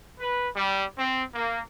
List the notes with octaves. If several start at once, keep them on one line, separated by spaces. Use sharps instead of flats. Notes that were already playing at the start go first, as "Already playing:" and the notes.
B4
G3
C4
A#3